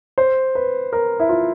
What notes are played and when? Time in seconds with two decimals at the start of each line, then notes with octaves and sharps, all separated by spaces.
0.18 C5
0.55 B4
0.93 A#4
1.20 E4
1.29 F4